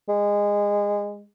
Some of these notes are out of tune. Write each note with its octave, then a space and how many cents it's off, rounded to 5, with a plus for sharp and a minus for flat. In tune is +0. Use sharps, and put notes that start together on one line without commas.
G#3 -20